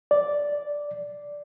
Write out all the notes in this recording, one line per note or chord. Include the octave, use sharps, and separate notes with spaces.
D5